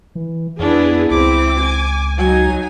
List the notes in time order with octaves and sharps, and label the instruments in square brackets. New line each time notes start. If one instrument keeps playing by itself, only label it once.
[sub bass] E3
[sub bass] F2 [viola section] B3 E4 G#4 [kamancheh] D4
[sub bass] C#2 [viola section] C4 E4 [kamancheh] D6
[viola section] G#5
[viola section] F#3 D#4 [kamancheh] G#5